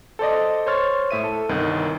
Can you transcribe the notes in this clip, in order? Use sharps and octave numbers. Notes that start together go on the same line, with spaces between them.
A4 C5 D5 D#5
C5 C#5 C6 F6 A6
A2 E5 D#7
A4
G1 C2 D#3